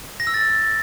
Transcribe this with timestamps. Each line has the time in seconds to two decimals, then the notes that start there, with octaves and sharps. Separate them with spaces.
0.20 A#6
0.27 E6
0.34 A6